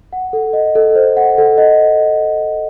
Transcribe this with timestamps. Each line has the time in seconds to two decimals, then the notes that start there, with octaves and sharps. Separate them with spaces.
0.13 F#5
0.33 A4
0.53 D#5
0.75 A4
0.96 C5
1.17 F#5
1.38 A4
1.58 D#5